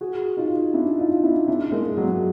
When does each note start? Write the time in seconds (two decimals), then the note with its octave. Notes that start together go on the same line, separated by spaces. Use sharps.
0.01 F#4 G#4
0.37 D#4 F4
0.74 D4 E4
0.99 D#4 F4
1.23 D4 E4
1.48 D4 E4
1.72 G#3 A#3
1.97 F#3 G#3